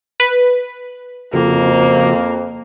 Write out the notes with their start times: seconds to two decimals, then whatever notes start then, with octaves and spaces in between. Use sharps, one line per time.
0.20 B4
1.33 F2 C#3 F3 A#3 F#4